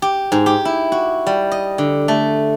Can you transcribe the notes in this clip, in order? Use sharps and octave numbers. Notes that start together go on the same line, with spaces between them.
G4
G#2
G4
E4
F#4
G3
D#5
D3
A3